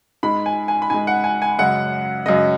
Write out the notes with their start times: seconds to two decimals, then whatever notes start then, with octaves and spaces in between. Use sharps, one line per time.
0.23 G#2 G#3 B5
0.46 G#5
0.68 G#5
0.82 B5
0.90 G#2 G#3 G#5
1.07 F#5
1.24 G#5
1.42 G#5
1.59 F#2 C#3 G#3 F#5
2.26 F#2 C#3 G#3 D#5